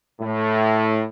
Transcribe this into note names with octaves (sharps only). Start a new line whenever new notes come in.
A2